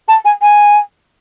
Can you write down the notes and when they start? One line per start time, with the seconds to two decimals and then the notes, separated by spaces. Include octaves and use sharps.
0.08 A5
0.25 G#5
0.42 G#5